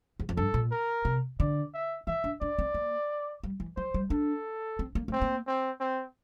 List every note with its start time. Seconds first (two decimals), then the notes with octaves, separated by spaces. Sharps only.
0.20 E2
0.29 F2
0.37 G2 A4
0.54 A#2
0.71 A#4
1.05 C3
1.40 D3 D5
1.74 E5
2.07 E3 E5
2.24 D4
2.41 D4 D5
2.59 C4
2.74 A#3
3.43 G3
3.60 E3
3.77 F3 C5
3.94 G3
4.10 D4 A4
4.79 C4
4.95 A#3
5.08 A3 C4
5.22 A#3
5.47 C4
5.80 C4